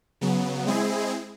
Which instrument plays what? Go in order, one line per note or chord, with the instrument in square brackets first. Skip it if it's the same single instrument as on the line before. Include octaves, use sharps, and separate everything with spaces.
[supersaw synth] C#3 F#3 B3
G#3 C4 E4 G#4